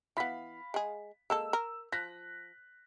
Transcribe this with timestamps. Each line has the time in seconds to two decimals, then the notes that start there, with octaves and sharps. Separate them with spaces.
0.17 E3 B3 F5 B5 B6
0.74 G#3 G#4
1.30 G#3 A#3 A4 E6
1.53 A#4
1.92 F3 F#6 A#6 B6